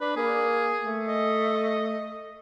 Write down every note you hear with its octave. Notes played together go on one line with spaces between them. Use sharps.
D4 B4
A#3 G#4
A3
D#5